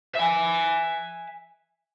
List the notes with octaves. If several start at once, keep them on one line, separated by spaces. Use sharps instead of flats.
E5 G#5